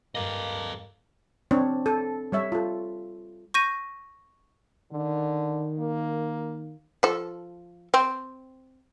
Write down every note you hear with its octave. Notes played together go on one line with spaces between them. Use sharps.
G2 A#3 A4 D#5
C4 D4 C#5
A4
G3 C#5 E5
F4 A4
C#6 G6 A#6 D#7
D3 D#3
A#3
F3 A4
C4